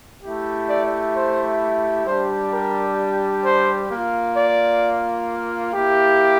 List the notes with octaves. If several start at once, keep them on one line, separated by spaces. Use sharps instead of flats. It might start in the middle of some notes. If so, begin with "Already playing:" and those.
A3 E4 G4
D5
C5
G3 D4 G4 C5
A#4
C5
A#3 F4
D5
A#3 E4 G4